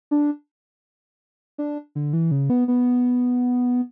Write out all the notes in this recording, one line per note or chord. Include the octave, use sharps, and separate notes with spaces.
D4
D4
D3
E3
C#3
B3
B3